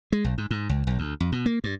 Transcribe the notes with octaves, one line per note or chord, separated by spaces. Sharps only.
G#3
B1
G#2
G#2
C#2
B1
D2
F2
B2
A#3
G2